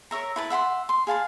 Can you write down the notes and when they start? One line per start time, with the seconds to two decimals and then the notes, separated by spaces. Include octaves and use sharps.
0.11 A#4 C#5 E5 A#5
0.36 E4 B4 A5
0.50 E5 F#5 B5 C6
0.89 C6
1.07 G#4 F5 A5 B5